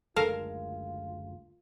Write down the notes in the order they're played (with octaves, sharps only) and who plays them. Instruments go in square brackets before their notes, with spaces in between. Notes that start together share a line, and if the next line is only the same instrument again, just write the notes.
[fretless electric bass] F#1 D2 G#3 [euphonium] F4 [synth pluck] A4 E7 [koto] A#4 F5